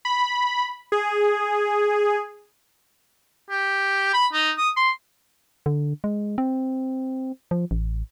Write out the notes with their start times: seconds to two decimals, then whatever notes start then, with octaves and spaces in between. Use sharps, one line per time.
0.05 B5
0.92 G#4
3.50 G4
4.14 B5
4.33 D#4
4.58 D#6
4.77 C6
5.66 D3
6.04 G#3
6.38 C4
7.51 F3
7.71 A1